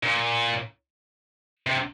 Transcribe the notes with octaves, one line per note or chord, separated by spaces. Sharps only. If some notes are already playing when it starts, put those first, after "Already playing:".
A#2
C3